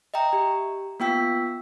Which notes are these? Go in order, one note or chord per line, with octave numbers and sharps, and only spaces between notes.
D#5 E5 G5 A#5
G4
A#3 B3 F4 G5 E6 B6